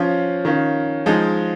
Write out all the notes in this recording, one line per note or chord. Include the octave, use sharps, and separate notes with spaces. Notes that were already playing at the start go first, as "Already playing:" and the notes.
Already playing: F3 C#4 F4
D#3 C#4 F4
F3 G#3 D#4